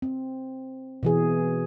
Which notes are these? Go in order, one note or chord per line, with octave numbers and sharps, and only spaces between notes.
C4
B2 E3 G#4